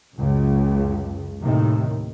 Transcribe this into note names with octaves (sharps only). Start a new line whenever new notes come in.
C#2 F#2 C#3
D#2 A2 C3 D#3